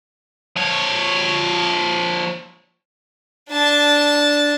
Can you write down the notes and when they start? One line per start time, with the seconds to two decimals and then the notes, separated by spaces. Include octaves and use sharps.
0.57 F3 C#5
3.50 D4 A5